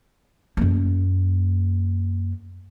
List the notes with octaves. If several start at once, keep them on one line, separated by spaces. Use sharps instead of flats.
F#2 A#3